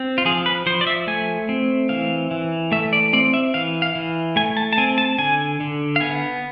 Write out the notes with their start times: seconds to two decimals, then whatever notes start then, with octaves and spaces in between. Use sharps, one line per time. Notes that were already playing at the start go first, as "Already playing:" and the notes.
Already playing: C4
0.18 F4
0.25 F3 G#4
0.46 B4
0.66 F3 C5
0.81 D5
0.87 E5
1.07 A3 G#5
1.49 C4
1.89 E3 F5
2.31 E3
2.72 A3 E5
2.93 D5
3.13 C4 D5
3.34 E5
3.54 E3 F5
3.82 F5
3.95 E3
4.36 A3 G#5
4.57 A5
4.73 A5
4.78 C4 G#5
4.98 A5
5.18 D3 G#5
5.60 D3
5.96 F5
6.00 B3 G#5